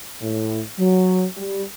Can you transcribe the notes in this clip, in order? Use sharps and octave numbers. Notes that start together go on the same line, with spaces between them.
A2
F#3
G3